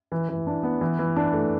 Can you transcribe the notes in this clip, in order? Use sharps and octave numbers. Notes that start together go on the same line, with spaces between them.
E3
E3
D4
B3
E3
E3
D4
A3